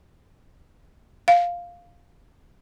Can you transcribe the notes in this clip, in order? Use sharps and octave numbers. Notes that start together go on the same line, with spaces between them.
F5